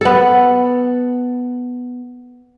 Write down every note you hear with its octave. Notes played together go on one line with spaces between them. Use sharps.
B3 A4